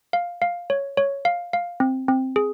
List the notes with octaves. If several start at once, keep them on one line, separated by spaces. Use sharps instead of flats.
F5
F5
C#5
C#5
F5
F5
C4
C4
G#4